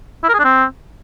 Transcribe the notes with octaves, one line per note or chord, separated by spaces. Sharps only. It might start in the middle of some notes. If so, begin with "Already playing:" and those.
E4
A#4
G#4
D4
C4